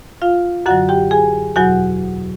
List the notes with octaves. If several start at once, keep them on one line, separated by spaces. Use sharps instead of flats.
F4 F5
F#2 D3 F#3 F#4 F#5
G4 G5
G#4 G#5
E2 B2 F#3 F#4 F#5